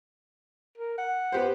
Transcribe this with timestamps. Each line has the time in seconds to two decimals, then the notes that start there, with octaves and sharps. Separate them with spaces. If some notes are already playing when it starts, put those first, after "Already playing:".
0.78 A#4
0.98 F#5
1.32 B3 G4 C5